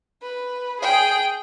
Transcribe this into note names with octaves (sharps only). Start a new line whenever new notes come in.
B4
G#4 G5